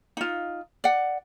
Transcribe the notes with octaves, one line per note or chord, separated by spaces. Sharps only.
D#4 F4
D5 F#5